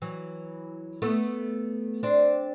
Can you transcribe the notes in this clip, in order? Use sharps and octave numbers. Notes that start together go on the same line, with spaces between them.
E3 F#3
A3 B3
C4 D4